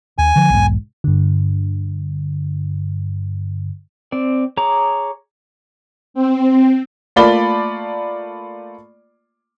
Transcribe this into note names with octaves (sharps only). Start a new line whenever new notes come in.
D#2 G#5
D3 F3
B1 E2 G#2
G2 D3
C4 D5
G#4 C#5 A#5 D6
C4
A3 A#3 F4 D5 B5 G7